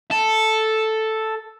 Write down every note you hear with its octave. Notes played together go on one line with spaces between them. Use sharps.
A4